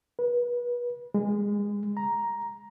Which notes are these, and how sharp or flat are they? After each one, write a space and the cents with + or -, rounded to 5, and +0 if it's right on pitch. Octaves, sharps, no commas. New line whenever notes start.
B4 -30
G#3 -20
A#5 +10